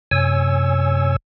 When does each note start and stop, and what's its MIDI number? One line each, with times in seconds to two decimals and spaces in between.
0.11 1.16 42
0.11 1.16 48
0.11 1.16 73
0.11 1.16 80
0.11 1.16 88